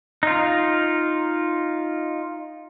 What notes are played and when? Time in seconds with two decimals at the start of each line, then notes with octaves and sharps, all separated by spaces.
0.23 D#4 F4